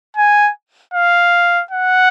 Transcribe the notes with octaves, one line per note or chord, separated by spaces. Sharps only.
G#5
F5
F#5